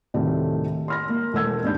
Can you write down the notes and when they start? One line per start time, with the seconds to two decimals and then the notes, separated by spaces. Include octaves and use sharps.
0.14 D2 A2 C3 D#3 G3 A3
0.88 C6 F6 A#6
1.09 A#3
1.33 E1 A3 A4 E6 G#6
1.63 G#1 D#2 D4 G6